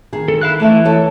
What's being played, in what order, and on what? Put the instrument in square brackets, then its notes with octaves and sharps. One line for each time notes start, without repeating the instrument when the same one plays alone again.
[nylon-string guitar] D#3 G#4
[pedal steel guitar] A4
E4 F5 F#6
[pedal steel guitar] E3 [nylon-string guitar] A3 A4 E5
[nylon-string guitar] E4 A4 C#5